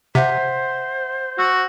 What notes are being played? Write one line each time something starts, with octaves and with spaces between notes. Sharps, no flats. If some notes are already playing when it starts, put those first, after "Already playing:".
C3 C5 E5 F#5 B6
F#4 E6